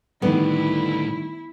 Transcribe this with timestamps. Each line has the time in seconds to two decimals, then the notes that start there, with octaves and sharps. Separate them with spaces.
0.22 A2 D3 D#3 G3 A3 B3 E4